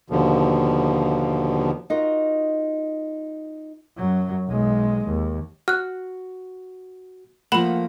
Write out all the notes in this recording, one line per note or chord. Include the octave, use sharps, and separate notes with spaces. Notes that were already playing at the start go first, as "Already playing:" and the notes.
D#2 B2 D3 F3
D#4 F4 F#4 A#4 D#5
F#2 F#3
B1 G#3
D#2
F#4 F6 F#6
F3 A3 A#3 F#5 B5 F#7